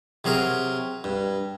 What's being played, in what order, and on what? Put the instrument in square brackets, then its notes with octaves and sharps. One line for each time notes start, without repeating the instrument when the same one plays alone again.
[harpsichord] C3 F#3 G#4 A#4
G2